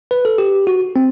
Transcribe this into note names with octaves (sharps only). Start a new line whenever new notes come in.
B4
A4
G4
F#4
C4